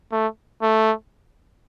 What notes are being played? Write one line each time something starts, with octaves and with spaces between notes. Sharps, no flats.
A3
A3